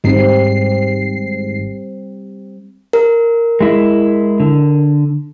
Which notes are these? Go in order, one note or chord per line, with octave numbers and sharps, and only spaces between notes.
G#1 G#2 G3 C4 C7
A#4
G#3 E4
D3